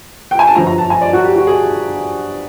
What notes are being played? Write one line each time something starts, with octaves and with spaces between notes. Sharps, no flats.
G5
G#5
A5
G1 F#2 D3 F3 A#5
A#5
A5
G#5
D5
F#4
G4
F#4
G#4